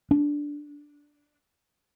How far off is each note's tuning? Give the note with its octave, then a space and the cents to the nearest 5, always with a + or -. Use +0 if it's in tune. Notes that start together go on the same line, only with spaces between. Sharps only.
D4 -5